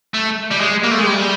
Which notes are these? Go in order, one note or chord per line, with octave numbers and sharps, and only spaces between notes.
A3
G3
G#3
A#3
A3
G#3
G3